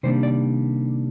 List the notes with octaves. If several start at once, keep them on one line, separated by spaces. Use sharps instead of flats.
C3 D#3 G3 A#3 D4 C5
D5